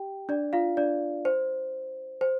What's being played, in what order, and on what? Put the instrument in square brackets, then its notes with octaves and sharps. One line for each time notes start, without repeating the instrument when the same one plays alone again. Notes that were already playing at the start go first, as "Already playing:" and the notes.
Already playing: [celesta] G4 G5
D4 D5
F4 F5
D4 D5
C5
C5